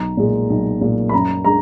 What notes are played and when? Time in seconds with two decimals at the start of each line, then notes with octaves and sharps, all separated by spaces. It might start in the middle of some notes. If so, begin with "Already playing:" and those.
Already playing: B1 A#5
0.17 A#2 G#3
0.50 B1
0.81 A#2 G#3
1.09 B5
1.13 F#2 A#5
1.45 G#3 D4 A#5